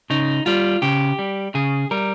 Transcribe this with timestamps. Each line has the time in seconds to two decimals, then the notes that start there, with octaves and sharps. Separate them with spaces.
0.10 C#3 D#4
0.46 G3 F4
0.82 C#3 G4
1.19 G3
1.55 C#3 G#4
1.91 G3 A#4